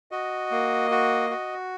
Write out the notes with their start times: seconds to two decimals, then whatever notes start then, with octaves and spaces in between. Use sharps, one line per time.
0.11 F#4 D#5
0.51 A#3
0.91 F#4
1.30 F#4